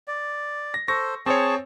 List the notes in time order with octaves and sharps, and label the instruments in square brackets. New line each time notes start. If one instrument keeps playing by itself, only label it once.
[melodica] D5
[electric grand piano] A#6
[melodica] A4 C5 [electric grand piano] C#6 A#6
[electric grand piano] C4 C5 C#5 [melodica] G#4 A5 C#6